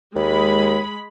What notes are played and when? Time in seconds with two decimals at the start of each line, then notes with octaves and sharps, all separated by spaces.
0.15 D#2 G#3 B5